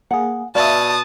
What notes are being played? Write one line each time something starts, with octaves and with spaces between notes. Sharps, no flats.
A#3 G#4 F#5
B2 D5 E5 F5 A5 D#6